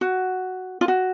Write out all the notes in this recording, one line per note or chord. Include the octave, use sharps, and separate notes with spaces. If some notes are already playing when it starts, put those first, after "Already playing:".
F#4
F4
F#4